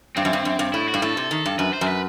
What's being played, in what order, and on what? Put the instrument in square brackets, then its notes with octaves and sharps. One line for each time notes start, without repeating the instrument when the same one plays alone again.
[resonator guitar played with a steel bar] G2 [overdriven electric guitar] C4
[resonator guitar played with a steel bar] F#2
G2
F#2
G2
[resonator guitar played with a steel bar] A2 [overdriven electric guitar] E4
[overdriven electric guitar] F#4
[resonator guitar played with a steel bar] G2
[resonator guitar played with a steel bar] A2 [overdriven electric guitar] A4
[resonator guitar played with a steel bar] C3
D#3
G2
[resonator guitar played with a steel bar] F#2 [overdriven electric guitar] B4
[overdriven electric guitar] C5
[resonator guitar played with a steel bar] F#2
[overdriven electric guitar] B4